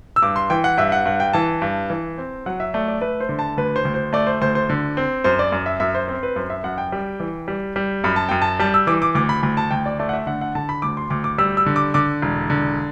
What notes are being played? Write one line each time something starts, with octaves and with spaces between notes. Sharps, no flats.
E6
G2 D6
C6
E3 G5
F#5
G2 E5
F#5
G2 F#5
G5
E3 A5
G2
E3
C4
F#3 F#5
E5
A3 D5
D5
A3 B4
C5
D3
A5
D2 B4
C5
D2
C5
A3 D5
C5
D2 C5
C5
D3
C4
F#2 C5
D5
F#2
E5
F#2 E5
C5
C4 C5
B4
F#2 C5
E5
F#2 F#5
G5
G3
E3
G3
G3
F#2 B5
A5
F#2 G5
A5
G3 A5
E6
E3 D6
D6
D2 D6
B5
D2 B5
A5
D2 G5
D5
A3 D5
F#5
E5
D3 F#5
F#5
D3 A5
B5
D2 D6
C6
D2 D6
D6
G3 E6
E6
D3
D6
D3 D6
E1
D3